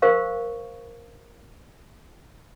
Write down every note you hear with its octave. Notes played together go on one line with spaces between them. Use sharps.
A#4 C5 F5 C#6